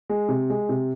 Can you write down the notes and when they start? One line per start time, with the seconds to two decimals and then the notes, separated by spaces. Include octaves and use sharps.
0.09 G#3
0.29 C3
0.50 G#3
0.69 C3